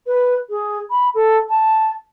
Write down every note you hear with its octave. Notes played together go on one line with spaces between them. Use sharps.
B4
G#4
B5
A4
A5